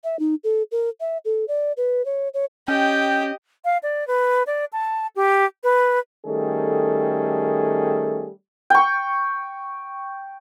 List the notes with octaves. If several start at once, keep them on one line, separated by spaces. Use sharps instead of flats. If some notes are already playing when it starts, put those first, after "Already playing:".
E5
D#4
A4
A#4
E5
A4
D5
B4
C#5
C#5
C#4 G4 D#5 G5
F5
D5
B4
D5
A5
G4
B4
D#3 G3 A3 C#4 G#4 A4
G5 C#6